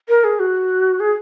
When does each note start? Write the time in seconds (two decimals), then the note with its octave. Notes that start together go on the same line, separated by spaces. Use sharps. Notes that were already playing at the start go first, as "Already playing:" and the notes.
0.09 A#4
0.24 G#4
0.40 F#4
1.00 G#4